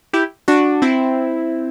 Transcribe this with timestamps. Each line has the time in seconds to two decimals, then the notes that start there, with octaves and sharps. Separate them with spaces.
0.13 E4 G4
0.48 D4 F#4
0.82 C4 E4